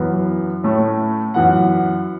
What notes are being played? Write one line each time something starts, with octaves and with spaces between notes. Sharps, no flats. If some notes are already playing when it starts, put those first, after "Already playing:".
Already playing: F#2 E3 B3
A2 A3 C#4
F#2 E3 B3 F#5